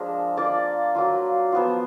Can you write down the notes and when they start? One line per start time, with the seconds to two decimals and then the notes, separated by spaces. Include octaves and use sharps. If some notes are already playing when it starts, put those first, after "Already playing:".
Already playing: F3 G#3 D4 A#4
0.37 A#3 F4 A#4 D5
0.95 F#3 A#3 F4
1.52 F3 B3 F4